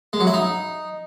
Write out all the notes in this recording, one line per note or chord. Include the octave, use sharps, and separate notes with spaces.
G#3
F#3
E4
D#4